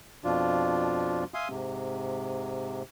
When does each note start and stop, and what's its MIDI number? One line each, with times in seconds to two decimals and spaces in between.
0.24 1.24 41
0.24 1.24 47
0.24 1.24 53
0.24 1.24 62
0.24 1.24 65
1.34 1.48 76
1.34 1.48 77
1.34 1.48 80
1.34 1.48 84
1.34 1.48 87
1.49 2.82 44
1.49 2.82 48